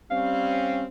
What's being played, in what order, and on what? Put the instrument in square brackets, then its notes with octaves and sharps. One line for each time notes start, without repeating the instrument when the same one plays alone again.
[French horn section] G3 C4 C#4 [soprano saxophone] F5